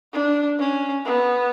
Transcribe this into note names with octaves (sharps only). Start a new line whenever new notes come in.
D4
C#4
B3